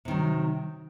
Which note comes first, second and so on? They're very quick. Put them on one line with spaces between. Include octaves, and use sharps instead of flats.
C3 D#3 F#3